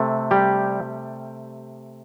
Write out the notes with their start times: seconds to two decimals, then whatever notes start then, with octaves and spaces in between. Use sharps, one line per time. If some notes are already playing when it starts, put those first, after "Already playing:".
Already playing: C3 A3
0.31 G3 G4